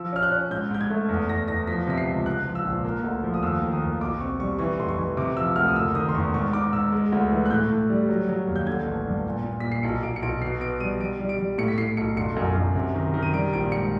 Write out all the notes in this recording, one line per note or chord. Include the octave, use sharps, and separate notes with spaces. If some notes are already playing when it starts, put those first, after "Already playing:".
Already playing: F3 E6
C#4 F6
F#6
C#4
G#2 G6
G#2 G6
G#6
A3
E2
E2 A#6
E2 A#6
F3 B6
C3 B6
C7
C#2
G#2 F#6
F3
E6
A#1
A#3
D2
F3
D#6
D#2 E6
D#3
D#6
D#2
B1 D6
C4 C#6
G3 C#6
E3 C#6
F1 C6
C#6
E3
C3 D6
F3 E6
D2 F6
D#6
F#1 E6
D#3 D#6
C6
E2 C#6
G#2 C#6
D#4 D6
G#2 E6
G#3
D2
E3
F#6
A2 G6
A2
G3
F#3
F#3
D#2
G6
D3 G#6
A1
G2
A#2
A#2
A#2 B6
C7
B1 C#7
B1 D7
C#7
B1 D7
B2 C7
B3 D7
G3 D#7
G3 D7
G3
D7
G3
A2 C#7
B6
A2 C7
B1 C#7
G1 C#7
F#2
F#2
C3
D#3
D#3
D#7
G3 D7
A#1 D7
G#2 C#7